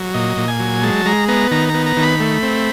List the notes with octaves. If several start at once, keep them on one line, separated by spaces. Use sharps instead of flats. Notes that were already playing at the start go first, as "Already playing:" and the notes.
Already playing: F#3
A#2 D#5
A#2
G#5
F#3
G#3 A5
G#3 A#5
B3 A#5
D#3 A#5
A#5
B3
A#5
D#3
B5
A3
C4